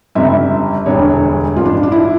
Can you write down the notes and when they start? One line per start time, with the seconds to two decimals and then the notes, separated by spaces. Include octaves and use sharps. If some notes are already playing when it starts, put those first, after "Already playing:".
0.15 G1 F2 C#3 G3 E5
0.86 E1 D2 D3 G3 C#5
1.56 A1 G2 F3 F4
1.65 D4
1.83 D4
1.92 E4